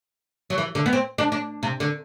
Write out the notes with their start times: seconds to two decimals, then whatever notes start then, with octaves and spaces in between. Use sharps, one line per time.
0.50 F#3
0.58 E3
0.75 D3
0.86 B3
0.93 C4
1.18 D4
1.32 D4
1.63 C3
1.80 D3